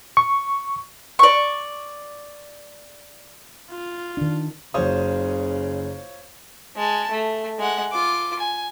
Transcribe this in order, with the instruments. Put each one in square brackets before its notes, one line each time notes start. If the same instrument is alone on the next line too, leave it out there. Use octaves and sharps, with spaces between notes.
[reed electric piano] C#6
[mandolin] D5 C#6
[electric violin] F4
[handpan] D#3 D4
[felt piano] F#1 D#6 [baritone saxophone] C#3 [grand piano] F4 C5 C#5
[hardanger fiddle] G#3 A5
A3
G#3 F#5
F4 D6
G#5